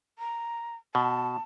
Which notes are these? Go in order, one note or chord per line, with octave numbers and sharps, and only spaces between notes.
A#5
B2 A5